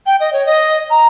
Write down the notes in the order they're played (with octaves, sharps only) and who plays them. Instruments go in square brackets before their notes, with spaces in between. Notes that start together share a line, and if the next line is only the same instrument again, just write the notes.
[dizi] G5
D#5
C#5
D#5
A#5